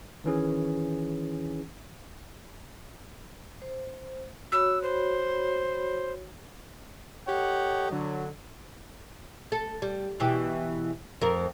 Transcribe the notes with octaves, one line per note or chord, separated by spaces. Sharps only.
D#3 E3 C#4 G#4
C5
F#4 C#5 B5 E6
C5
G4 A4 C#5 D#5 F#5
D3 F#3
A4
G3
B2 E3 G4
F2 A#4